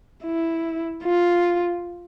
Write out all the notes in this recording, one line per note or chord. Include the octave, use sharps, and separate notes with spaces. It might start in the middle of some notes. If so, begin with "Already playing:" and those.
E4
F4